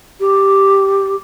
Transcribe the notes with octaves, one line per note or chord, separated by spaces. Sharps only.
G4